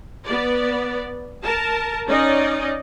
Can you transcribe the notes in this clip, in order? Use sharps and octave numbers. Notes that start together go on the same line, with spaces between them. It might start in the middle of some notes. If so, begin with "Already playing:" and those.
B3 D5
A#4 A5
C#4 D#4 D5 D#5